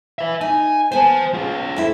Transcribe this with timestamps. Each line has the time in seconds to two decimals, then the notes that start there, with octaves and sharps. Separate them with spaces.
0.19 B4 E5
0.41 D#4 G#5
0.92 B3 C5 G#5 A5
1.34 F4 G#4
1.76 F2 E4